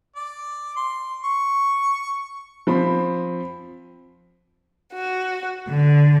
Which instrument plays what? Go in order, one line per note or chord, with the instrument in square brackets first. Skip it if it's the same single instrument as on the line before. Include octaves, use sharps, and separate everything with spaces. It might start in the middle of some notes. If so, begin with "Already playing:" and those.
[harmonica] D5
C6
C#6
[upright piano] F3 C4 B5
[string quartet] F#4
D3